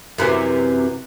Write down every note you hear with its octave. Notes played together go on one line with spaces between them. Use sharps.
F#2 C3 E3